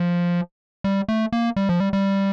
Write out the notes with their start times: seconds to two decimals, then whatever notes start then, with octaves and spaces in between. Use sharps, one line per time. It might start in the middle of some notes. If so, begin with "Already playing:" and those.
Already playing: F3
0.84 G3
1.09 A3
1.33 A#3
1.56 G3
1.69 F3
1.80 G3
1.93 G3